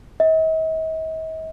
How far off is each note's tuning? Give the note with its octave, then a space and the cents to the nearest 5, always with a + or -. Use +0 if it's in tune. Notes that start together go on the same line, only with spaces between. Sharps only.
D#5 +45